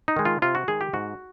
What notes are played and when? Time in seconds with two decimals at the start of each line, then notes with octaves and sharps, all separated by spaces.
0.08 D#4
0.17 D#3 G#3
0.25 F4
0.42 C3 F4
0.55 F#4
0.68 D#3 G#3 G#4
0.81 G4
0.93 G#2 F#4